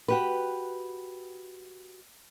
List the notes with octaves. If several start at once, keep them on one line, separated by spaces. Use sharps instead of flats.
F#4 G4 B4